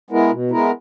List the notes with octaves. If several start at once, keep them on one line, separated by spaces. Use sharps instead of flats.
G#3 B3 E4 A#4
B2
G#3 B3 E4 A#4